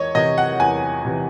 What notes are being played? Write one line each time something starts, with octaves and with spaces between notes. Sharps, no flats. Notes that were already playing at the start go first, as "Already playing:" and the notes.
Already playing: E2 C#5 D#5
C3 E3 D#5
F#5
E2 G#5
C3 E3